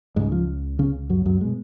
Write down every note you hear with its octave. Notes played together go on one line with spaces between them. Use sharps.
C#2 G#2 C#3 G#3
F3
C#3 C#4
F#2 F#3
F#2 F#3
B2 G#3